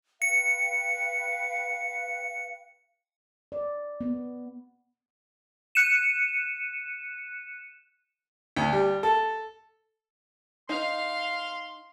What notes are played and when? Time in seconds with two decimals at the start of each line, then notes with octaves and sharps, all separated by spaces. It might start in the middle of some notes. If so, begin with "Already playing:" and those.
0.22 B4 F5 G5 C#7
3.52 D5
4.01 B3
5.75 F#6 C#7 D#7 E7
8.57 D2
8.73 G3
9.03 A4
10.69 D#4 F5 C6